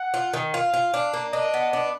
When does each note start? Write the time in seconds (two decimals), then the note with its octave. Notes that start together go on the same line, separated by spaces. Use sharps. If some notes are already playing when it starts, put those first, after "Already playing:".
Already playing: F#5
0.14 F4
0.33 D#3
0.53 F4 F5
0.74 F4
0.94 D4
1.14 A#3
1.33 D4 D#5
1.54 B3
1.73 D4